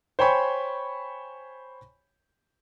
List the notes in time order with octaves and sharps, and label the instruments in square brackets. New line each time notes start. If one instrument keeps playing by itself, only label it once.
[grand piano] C5 C#5 G5 G#5 B5 C#6